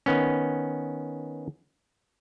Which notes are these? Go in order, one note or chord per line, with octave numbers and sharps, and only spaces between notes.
D#3 B3 C#4